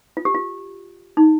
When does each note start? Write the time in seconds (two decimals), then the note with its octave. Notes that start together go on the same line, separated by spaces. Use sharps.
0.17 F4
0.25 G4
0.34 F4
1.17 D#4